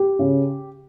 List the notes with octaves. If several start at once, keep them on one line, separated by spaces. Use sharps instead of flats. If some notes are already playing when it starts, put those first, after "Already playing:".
Already playing: G4
C#3